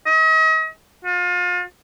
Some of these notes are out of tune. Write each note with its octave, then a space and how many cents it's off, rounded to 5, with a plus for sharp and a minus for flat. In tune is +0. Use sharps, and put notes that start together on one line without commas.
D#5 +40
F4 +35